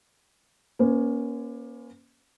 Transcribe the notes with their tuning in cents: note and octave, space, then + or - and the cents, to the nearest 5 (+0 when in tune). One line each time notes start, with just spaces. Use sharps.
A#3 +25 C#4 +0 C5 -45